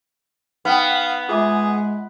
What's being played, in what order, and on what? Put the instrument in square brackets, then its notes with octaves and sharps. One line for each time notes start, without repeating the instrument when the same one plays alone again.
[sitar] B3 [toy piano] D#4 G5 [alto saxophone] F5
[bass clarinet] G#3 [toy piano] F4 E5 D6 [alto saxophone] G#4